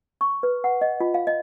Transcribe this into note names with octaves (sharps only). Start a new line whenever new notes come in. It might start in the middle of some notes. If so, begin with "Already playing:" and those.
C#6
B4
F#5
D#5
F4
F5
D#5